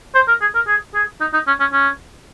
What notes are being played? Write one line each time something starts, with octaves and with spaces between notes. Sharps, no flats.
C5
A#4
G#4
A#4
G#4
G#4
D#4
D#4
C#4
C#4
C#4